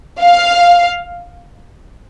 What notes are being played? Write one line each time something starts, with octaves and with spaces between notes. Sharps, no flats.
F5